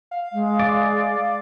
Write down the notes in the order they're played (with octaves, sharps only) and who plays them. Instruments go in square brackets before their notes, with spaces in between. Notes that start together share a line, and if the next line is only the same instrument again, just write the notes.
[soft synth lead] F5
[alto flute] G#3
[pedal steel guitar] D5